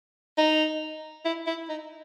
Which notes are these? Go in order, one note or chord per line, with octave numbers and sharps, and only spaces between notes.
D#4
E4
E4
D#4